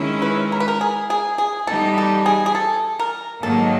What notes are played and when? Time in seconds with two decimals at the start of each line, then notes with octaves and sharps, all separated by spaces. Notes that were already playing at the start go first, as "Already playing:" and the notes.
Already playing: D#3 G#3 C#4 E4
0.22 B4
0.52 A#4
0.60 B4
0.68 A#4
0.81 G#4
1.10 G#4
1.38 G#4
1.67 E3 G3 B3 D#4 G4 A4
1.98 A4
2.26 G#4
2.46 G#4
2.55 A4
2.99 A#4
3.43 G#2 D#3 F#3 A#3 A4